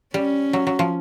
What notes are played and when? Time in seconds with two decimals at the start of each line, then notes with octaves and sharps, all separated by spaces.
0.14 G3 C#4
0.53 F#3
0.67 F#3
0.79 F3